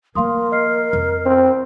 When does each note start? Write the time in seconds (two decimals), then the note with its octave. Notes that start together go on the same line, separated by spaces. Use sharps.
0.15 F3 A#3 A#4 F5 C6 D#6
0.52 D#5 F6 C7
0.93 F2
1.26 C4